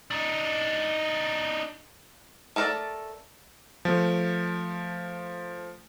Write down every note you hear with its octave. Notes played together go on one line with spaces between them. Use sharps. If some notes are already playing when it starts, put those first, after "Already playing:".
D4 D#4
A3 A4 A#4 C5 D5
F3 A3